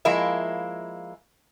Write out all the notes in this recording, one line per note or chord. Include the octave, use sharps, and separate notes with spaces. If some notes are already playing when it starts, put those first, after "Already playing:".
F3 G#3 A#3 E4 E5